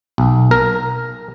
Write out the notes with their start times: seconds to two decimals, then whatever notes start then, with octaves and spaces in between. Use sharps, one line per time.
0.18 B1
0.51 A#4